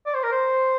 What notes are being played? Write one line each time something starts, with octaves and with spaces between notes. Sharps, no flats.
D5
C5
A#4
C5